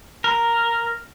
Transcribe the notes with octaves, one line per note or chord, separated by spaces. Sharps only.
A#4